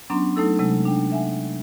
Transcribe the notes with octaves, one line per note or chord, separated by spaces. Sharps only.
F#3 B3 C#4 D4 A#5 C6
F#3 A3 D#4 A4 E6
C3 F#3 G#3 A3
D4 G5
E5 F#5 G#5